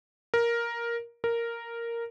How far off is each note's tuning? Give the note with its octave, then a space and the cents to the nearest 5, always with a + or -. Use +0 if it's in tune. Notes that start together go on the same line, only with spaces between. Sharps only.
A#4 +5
A#4 -5